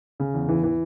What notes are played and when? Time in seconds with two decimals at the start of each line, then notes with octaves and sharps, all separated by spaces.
0.20 C#3
0.34 E2
0.49 E3
0.63 E3